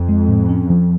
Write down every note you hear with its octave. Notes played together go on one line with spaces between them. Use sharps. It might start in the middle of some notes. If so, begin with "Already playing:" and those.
Already playing: F2
G#3
A2
C#4
F3